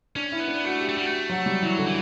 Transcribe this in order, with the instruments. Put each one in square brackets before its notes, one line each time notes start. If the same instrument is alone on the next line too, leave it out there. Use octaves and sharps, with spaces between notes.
[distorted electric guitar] C#4 [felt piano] D4
[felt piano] E4
[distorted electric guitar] B3
[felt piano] D4
[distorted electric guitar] A3 [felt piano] F#4
[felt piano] G4
[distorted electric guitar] A3
[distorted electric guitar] G3 [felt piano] F#4
[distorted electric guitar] A3
[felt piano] F#3
G3
[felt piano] E3 [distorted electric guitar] F#3
[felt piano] D3
[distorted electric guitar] E3